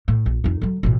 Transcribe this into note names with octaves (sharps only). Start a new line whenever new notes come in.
A2
A#1
F2 D#4
D3 F#3
A1 B2